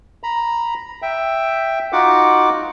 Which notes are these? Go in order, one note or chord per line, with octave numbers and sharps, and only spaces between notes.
A#5 B5
E5 G5
D#4 F4 F#4 F#5 D6